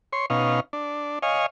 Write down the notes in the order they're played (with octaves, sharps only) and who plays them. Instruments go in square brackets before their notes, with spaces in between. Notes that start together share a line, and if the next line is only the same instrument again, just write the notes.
[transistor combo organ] C#5 C6
B2 C#4 D#4 F5
D4
C#5 D#5 F5 G#5